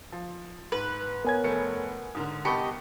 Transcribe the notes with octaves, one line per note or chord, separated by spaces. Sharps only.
F3
G#2 B4
B3 A#4 C#5 G#5 G#6
F1 A3 C#7
G#2 D3 A#4 D#6
C2 B3 G4 D#5 A5 B5 C#6 C#7